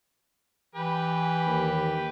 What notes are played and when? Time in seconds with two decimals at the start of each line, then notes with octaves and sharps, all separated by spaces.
0.75 E3 G4 B4
1.46 D#2